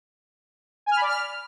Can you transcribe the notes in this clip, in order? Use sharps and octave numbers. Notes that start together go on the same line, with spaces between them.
G#5
F6
B5
D5
F6